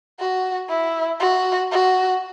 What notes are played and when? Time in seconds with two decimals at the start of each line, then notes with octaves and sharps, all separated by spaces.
0.19 F#4
0.69 E4
1.20 F#4
1.71 F#4